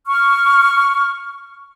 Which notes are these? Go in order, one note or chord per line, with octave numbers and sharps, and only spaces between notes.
C#6 F6